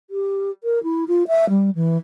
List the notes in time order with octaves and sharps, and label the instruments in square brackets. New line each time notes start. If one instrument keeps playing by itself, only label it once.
[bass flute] G4
A#4
E4
F4
E5
G3
E3